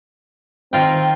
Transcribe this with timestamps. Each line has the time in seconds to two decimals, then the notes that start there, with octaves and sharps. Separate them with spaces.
0.73 D#3 C4 F4 G5